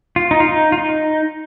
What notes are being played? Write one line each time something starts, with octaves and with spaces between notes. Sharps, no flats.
F4
D#4
F4
D#4
F4
D#4